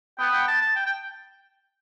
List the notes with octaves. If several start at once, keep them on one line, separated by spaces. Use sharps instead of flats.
B3 G5
G5
A5
A5
G5
G5